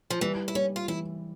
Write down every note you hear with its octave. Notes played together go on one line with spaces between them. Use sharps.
F3
E3 G3
E4
G3 C#4
F4
E3 E4